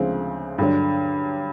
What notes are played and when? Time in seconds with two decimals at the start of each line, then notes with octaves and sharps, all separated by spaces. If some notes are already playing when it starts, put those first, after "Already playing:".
Already playing: D2 C#3 F3 G#3 C4
0.58 G2 D3 F#3